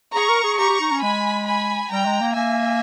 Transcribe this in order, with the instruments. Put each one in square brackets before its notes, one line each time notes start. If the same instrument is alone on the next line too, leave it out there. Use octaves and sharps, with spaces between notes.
[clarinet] G#4 [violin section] A#5 C#6
[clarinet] A#4
G#4
[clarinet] G4 [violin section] A#5 C#6
[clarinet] G4
D#4
C#4
[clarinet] G#3 [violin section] G#5 B5
[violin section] G#5 B5
[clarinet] G3 [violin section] G5 A#5
[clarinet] G#3
A#3
[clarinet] A#3 [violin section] E5 G#5